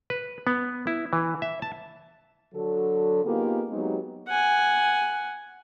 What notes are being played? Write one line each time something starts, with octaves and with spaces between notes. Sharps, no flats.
B4
B3
E4
E3
E5
A5
D3 F#3 F#4 A4
A#3 B3 D#4 F4 G4 G#4
F#3 G#3 B3 C4 D#4 G4
F#5 G#5